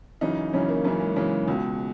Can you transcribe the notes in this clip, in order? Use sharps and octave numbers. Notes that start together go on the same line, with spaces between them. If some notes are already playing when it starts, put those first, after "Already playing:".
F#2 C#3 E3 D#4
F#2 C#3 E3 C#4
A#3
F#2 C#3 E3
G#3
F#2 C#3 E3 G#3
C#2 B2